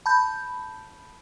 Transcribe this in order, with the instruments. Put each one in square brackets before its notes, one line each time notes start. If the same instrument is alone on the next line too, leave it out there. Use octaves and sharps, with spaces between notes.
[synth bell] A5 B5 G6